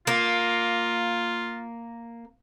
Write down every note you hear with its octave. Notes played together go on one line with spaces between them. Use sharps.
A#3 F4